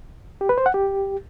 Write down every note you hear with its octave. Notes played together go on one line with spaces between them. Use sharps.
G4
B4
C5
F#5
G4